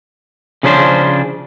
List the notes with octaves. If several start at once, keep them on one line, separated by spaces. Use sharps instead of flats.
C#3 F3 C#4 D4 C5